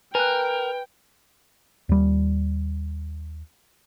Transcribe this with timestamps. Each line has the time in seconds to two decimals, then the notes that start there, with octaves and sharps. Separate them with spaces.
0.15 A#4 B4 G5 G#5 F#6
1.89 D#2 G3